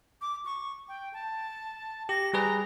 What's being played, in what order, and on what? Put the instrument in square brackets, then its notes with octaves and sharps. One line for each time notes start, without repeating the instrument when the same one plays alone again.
[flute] D6
C#6
G5
A5
[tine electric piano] G4 [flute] A#6
[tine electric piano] G3 G#4 B4 [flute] A#5